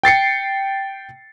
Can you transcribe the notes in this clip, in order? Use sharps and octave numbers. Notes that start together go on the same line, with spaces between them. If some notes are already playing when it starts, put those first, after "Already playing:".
G5 A6 C7 C#7